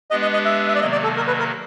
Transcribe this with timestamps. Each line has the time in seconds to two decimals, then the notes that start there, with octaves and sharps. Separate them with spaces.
0.11 G#3 B3 D4 G4 B4 D#5
0.22 D#5
0.34 D#5
0.45 E5
0.68 E5
0.75 D5
0.81 C3 D#3 F#3 A#3 D#5
0.92 D5
1.04 A4
1.16 A#4
1.27 B4
1.39 A#4